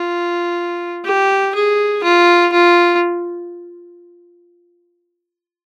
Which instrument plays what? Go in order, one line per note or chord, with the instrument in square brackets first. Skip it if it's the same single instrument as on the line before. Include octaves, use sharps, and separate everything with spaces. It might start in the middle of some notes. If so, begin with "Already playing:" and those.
Already playing: [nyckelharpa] F4
G4
G#4
F4
F4